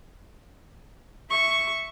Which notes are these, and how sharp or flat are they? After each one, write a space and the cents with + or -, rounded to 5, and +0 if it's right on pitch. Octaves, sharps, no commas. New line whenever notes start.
E5 +0 C#6 +0